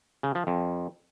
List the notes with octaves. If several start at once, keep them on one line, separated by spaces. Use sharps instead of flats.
C#3
F3
F2